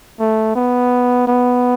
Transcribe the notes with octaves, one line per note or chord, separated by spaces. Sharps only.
A3
B3
B3